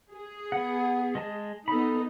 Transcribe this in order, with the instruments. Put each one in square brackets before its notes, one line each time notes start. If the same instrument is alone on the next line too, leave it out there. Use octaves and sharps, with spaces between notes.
[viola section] G#4
[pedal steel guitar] B3 F#5
G#3 D#5 A5
[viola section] B3 D#4 [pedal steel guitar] A4 B5